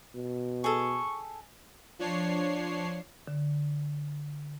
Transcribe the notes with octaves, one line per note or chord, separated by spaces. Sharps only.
B2
G#4 A4 C#6
F3 D4 C#5 C7
D3